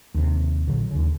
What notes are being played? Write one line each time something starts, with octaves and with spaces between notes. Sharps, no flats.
D#2 C3
A#1 A#2 D3 F#3
D#2 C#3